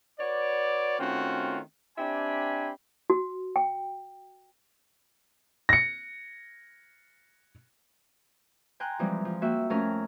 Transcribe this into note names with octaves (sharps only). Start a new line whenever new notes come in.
F#4 B4 C#5 D5
D#3 A3 C4 C#4 F4 F#4
C4 D4 G4 E5 G#5 B5
F#4
G5
A#6 C#7
G5 G#5 A#5 C6 F#6
E3 F3 G3 G#3 C4
F3
A#3 F#4 E5 G5
F2 A3 C#4 A#4 A#5 F6